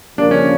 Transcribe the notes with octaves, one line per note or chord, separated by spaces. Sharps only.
C#3 F3 A#3 D4
C#4